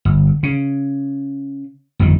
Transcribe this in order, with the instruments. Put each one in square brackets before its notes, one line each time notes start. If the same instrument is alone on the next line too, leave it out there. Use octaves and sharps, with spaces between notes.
[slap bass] G1
C#3
G1 F2 D#3